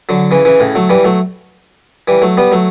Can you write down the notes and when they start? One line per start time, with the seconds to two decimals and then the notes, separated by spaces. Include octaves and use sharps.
0.09 D3 F#3
0.31 C#3 E3
0.45 C#3 E3
0.60 A2 C#3
0.75 F#3 A3
0.89 E3 G3
1.04 F#3 A3
2.08 E3 G3
2.22 F#3 A3
2.38 G3 B3
2.52 F#3 A3